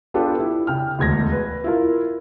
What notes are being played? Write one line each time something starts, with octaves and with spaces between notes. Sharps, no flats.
B3 D4 F4 G4 A4 B4
E4
C#3 G5 F6
E1 D2 G#6 A#6
B4
E4 F4 A#4